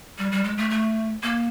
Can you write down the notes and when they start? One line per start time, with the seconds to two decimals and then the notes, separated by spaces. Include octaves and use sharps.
0.18 G3
0.32 G3
0.44 G#3
0.58 A3
0.70 A3
1.23 A#3